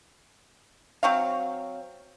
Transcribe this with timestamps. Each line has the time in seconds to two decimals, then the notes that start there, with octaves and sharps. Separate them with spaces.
1.03 F#3 C4 C#5 F5